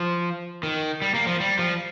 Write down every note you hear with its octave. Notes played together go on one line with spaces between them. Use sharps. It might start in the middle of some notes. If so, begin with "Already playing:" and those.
Already playing: F3
D#3
G3
A#3
F3
G3
F3